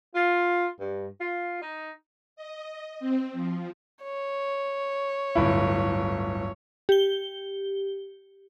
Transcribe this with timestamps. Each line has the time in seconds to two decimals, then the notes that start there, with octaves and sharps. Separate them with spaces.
0.16 F4
0.81 G2
1.21 F4
1.62 D#4
2.36 D#5
3.00 C4
3.33 F3
4.04 C#5
5.35 D1 G1 E4
6.89 G4 G7